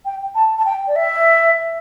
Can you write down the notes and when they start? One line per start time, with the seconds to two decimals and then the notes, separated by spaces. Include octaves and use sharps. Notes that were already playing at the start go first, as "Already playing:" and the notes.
0.05 G5
0.35 A5
0.58 A5
0.65 G5
0.87 D5
0.96 E5